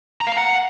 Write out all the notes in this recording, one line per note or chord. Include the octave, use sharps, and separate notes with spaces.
A#5
F5
A#5
F#5